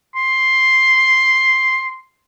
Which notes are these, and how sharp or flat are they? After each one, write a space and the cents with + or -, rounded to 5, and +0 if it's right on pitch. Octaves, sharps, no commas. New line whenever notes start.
C6 +5